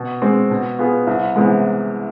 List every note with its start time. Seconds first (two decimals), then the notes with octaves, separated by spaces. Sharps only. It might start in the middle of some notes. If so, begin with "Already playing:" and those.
Already playing: B2
0.22 G#3 C4
0.50 B2
0.79 B3 F4 G#4
1.07 C2
1.36 C3 E3 G#3 B3